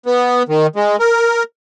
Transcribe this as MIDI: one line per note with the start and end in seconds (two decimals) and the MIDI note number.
0.06 0.43 59
0.48 0.67 51
0.76 0.96 56
1.00 1.43 70